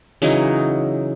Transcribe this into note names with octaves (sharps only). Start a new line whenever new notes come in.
C#3 E3 F#3 D#4